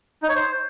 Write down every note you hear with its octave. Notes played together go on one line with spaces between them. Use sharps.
D#4
C#5
C5